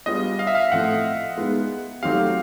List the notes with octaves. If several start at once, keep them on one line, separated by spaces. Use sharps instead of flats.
G3 B3 D4 F4 G#4 D#5
F5
E5
F5
A2 F3 A3 C4 F#5
G#3 B3 D#4
F#3 A3 C4 D#4 G4 F5